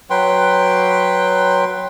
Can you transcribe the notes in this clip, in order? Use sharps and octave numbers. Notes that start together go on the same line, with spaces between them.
F#3 B4 G5 C6